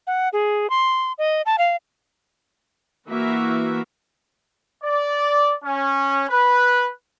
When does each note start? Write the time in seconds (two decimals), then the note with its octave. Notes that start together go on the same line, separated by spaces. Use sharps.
0.07 F#5
0.33 G#4
0.70 C6
1.18 D#5
1.46 A5
1.58 F5
3.07 E3 A#3 F#4 E5
4.84 D5
5.65 C#4
6.30 B4